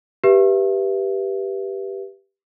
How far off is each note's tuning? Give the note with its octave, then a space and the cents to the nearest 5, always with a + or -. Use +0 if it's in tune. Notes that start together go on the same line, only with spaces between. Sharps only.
G4 +0 B4 -20 E5 +15